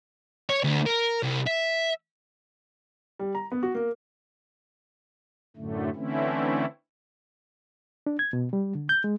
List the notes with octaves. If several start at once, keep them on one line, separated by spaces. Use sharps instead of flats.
C#5
D2
A#4
C2
E5
G3
A#5
B3
F#4
A#3
F#2 A2 D3 A3
D3 E3 A3 C4 C#4 E4
D4
G#6
B2
G3
D3
G6
G#3